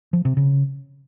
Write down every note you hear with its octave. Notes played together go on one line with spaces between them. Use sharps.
F3
C3
C#3